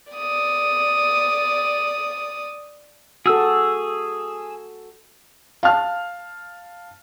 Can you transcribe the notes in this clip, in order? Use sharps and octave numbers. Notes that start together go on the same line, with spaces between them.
D5 D#6
F#4 G#4 A4 E6
F5 A5 F6